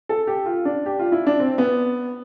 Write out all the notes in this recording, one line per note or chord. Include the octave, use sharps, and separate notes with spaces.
A4
G4
F4
D4
G4
F4
E4
D4
C4
B3